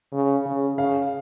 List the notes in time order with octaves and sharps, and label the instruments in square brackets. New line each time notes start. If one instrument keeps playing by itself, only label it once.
[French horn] C#3
C#3
[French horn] C#3 [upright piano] F5